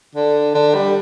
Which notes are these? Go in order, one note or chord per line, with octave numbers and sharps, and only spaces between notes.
D3
D3
G3